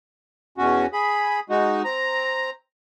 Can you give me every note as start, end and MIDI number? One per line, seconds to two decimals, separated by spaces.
0.58 0.86 40
0.58 0.86 47
0.58 0.86 61
0.58 0.86 66
0.93 1.40 68
0.93 1.40 83
1.50 1.82 56
1.50 1.82 63
1.50 1.82 66
1.84 2.50 60
1.84 2.50 82